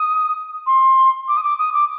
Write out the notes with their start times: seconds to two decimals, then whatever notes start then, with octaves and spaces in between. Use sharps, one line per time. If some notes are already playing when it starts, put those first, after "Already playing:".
Already playing: D#6
0.67 C6
1.28 D6
1.37 D#6
1.43 D6
1.59 D#6
1.74 D6